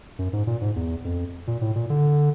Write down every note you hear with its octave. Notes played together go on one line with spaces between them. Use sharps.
F#2
G#2
A#2
G#2
E2
F2
A#2
A2
A#2
D3